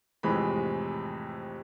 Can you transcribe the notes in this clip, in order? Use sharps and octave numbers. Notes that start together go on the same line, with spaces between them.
F2 A2 C3 E3 G#3 B5